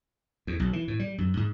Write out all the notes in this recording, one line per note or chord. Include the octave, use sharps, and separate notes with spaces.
E2
B1
E3
A2
G3
F#2
G#2